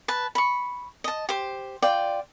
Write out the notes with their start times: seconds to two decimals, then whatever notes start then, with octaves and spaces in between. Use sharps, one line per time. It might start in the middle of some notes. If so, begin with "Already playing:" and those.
0.08 B4 A5
0.35 B5 C#6
1.04 D#5 A5
1.29 G4 C5
1.82 F4 D5 G5